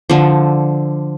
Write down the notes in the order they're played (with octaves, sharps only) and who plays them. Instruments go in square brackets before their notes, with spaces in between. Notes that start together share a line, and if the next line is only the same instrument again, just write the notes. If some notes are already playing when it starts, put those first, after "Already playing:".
[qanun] D3 F3